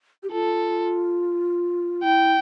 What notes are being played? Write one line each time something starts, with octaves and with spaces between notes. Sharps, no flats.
G4
F4 A4
E4 G5